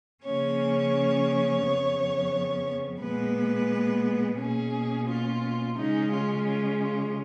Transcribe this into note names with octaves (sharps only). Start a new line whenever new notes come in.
C#3 F3 A#3 C#4 C#5
F2 C#3 F3 B3
A#2 G#3 B3 B4
B2 A#3 C#4 G#4
F4
C#3 G#3 C#4 D#4
F4
F4
F4